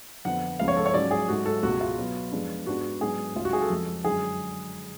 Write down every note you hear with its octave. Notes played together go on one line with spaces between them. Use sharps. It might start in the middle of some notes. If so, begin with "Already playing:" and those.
F2 D3 F3 B3 F#5
C#2 C#3 F3 B3 F5
C#5
A4
C#5
G#2 F#3 C#4 D5
G#4
G#2 F#3 A3 F#4
A4
C#2 B2 G#3 F#4
F4
B2 F#3 B3
F2 F3 G#3 B3 D4
G#2 G#3 B3 D4 F#4
G#2 F#3 B3 D4 G#4
C#2 C#3 F#3 C#4 F4
F#4
G#4
A4
F2 F3 G#3
F#2 D3 G#3 G#4